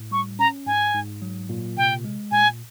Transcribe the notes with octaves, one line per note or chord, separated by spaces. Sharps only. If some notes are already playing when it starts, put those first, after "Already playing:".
Already playing: A2
G3 C#6
C#4 A#5
G#2 G#5
G#2
F#3
A#2
C3 G5
G#3
A#2 G#5